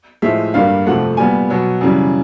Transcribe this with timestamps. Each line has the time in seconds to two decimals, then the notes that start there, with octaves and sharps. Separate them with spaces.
0.22 A2 F3 G#3 E5
0.54 G2 D3 G3 A#3 F5
0.86 F2 C3 F3 A3 F#5
1.17 A#2 G3 B3 G#5
1.50 B2 F#3 B3
1.81 F#2 C#3 E3 G3